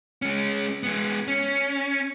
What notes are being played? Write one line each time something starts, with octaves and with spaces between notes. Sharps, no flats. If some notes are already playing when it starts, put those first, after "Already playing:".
G#3 C#4
G#3 B3
C#4